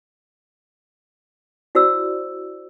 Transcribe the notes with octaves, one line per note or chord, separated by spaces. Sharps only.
E4 F#4 C5 D5 E6